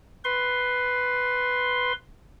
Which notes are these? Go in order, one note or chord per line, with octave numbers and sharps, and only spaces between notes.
B4 C6